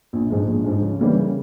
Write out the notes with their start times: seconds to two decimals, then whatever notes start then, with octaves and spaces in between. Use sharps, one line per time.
0.13 A#1
0.30 G#2 F3 G#3
0.47 A#1
0.64 G#2 F3 G#3
0.82 C#3
0.99 E3 G3 A#3 C#4
1.16 C#3